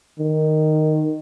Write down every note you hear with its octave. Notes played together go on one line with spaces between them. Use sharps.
D#3